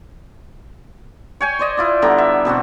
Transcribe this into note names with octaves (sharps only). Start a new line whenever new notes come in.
C#5 G5 G#5
C5 D5 D#5
E4 F4 D5
D3 G3 B3 A#5
E5
B2 E3 C4 F#4